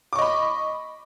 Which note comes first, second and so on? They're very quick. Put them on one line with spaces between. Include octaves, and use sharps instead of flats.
D6 C#6 D#5 B5